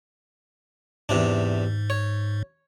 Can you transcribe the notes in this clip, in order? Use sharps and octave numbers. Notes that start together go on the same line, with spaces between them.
E2 G#2 C3 D4
C#5